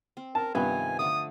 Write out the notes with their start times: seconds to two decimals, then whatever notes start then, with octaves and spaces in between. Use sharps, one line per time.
0.17 C4
0.35 A#4 A5
0.55 G2 C3 D#3 F3 B3 G#5
0.99 D3 A3 D6 D#6